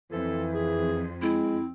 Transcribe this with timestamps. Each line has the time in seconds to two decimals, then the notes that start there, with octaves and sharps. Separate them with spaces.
0.12 F2 E3 A4
0.54 G#4
1.22 G#3 C4 E4